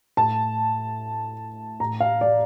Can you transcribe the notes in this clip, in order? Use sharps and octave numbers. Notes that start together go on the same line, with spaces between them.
A2 A5
A2 A#5
F5
D5